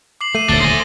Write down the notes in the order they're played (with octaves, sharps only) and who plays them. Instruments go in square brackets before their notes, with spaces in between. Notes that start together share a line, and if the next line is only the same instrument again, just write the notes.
[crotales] D6 C7 F#7
[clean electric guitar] A3 [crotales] C7 D#7 F#7
[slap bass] D#1 D2 [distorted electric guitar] D4 A4 [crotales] A6 G7
[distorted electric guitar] C5 G#5 [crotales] D#6 A#6